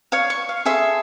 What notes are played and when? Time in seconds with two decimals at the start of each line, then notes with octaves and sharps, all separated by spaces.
0.12 C#5 F5
0.30 C#6
0.49 F5
0.65 G#4 A4 E5 C6